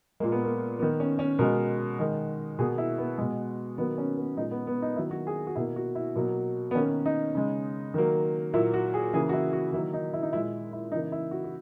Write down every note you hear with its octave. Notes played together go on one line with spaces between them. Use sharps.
A#2 G#3 A#3
B3
A#3
D#3 A#3 B3
C#4
C#4
B2 G#3 A#4
D#3 G#3
B2 A#3 G#4
E4
B3
B2 G#3
D#3 F#3 A#3 B3
C#4
B3
A#2 G#3 D#4
B3
B3
D#4
D#3 F#3 A#3 E4
F#4
G#4
F#4
B2 A#3 E4
F#4
E4
B2 F#3 A#3
B3
D#3 A#3 C#4
D#4
C#3 G#3
D#3 F#3 A#3
A#2 F#3 A#3 E4
F#4
G#4
C#3 E3 A#3 G#4
F#4
E4
F#4
D#3 F#3 A#3 E4
D#4
E4
D#4
A#2 G#3 E4
E4
C#3 E3 A#3 D#4
E4
F#4
F#4